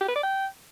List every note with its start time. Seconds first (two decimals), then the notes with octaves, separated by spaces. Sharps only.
0.01 G4
0.08 B4
0.16 D5
0.23 G5